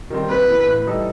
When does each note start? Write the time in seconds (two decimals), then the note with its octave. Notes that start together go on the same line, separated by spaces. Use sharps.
0.10 D#3 G3 C4
0.29 C3 B4
0.48 E3 B3
0.67 A2
0.86 E3 G3 D#4 A4